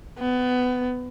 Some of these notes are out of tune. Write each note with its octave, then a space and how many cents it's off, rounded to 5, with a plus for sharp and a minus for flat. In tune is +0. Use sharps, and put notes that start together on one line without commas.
B3 +20